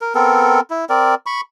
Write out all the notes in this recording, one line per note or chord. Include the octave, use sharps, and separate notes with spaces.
A#4
B3 C4 A4 A#4
E4
C4 A#4 D5
B5 C#6